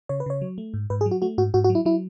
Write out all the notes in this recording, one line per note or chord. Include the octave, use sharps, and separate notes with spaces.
C#3 C#5
B4
C#3 C#5
F#3
A3
G#2
G#2 B4
G#4
F#3
F#4
A3 F#4
G#2 F#4
G#2 F#4
F#4
F#3
E4
F#3 E4